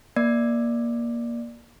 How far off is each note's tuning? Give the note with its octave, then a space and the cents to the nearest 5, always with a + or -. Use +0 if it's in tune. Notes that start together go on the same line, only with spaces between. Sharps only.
A#3 +20 D5 +10